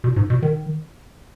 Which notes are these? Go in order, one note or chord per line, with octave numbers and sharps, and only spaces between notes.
B2
G#2
B2
D#3